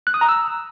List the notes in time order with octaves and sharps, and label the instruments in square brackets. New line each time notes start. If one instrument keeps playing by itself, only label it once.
[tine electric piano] F#6
D#6
A#5
E6